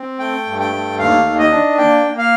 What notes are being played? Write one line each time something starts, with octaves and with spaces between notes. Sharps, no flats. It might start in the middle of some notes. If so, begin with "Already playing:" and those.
Already playing: C4
A3 G5
G2
G5
A3
D#2 F5
D#3
D#5
D4
A#3 G5
A#3
F5